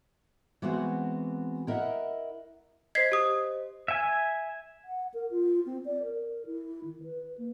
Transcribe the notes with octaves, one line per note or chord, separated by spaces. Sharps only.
E3 G#3 B3 C4 F#4
E4 A#4 D#5 E5 F#5
C5 D#5 G#6 B6 C7
G4 D#6
E5 G#5
F#5
A#4
F4
C4
D5
A#4
E4
D#3
B4
A#3